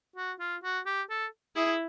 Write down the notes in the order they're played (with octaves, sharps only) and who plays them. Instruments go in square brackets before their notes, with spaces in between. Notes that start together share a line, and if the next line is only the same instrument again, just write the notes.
[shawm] F#4
F4
F#4
G4
A4
[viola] E4 [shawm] G#4